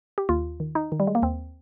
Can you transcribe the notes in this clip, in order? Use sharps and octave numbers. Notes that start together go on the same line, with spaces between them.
G4
D#2 F4
D#3
D#4
D#3
G3
G#3
A#3
D#2 C4